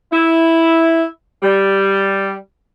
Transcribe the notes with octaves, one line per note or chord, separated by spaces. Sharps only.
E4
G3